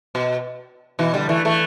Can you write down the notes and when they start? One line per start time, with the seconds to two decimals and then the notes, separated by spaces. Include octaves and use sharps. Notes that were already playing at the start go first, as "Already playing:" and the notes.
0.15 B2
0.99 B2 E3
1.14 D3 G3
1.29 E3 A3
1.45 E3 A3